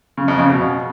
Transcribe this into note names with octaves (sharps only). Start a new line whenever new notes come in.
C#3
F2
C#3
B2